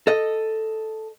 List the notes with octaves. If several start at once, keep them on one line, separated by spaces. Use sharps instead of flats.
A4 D#5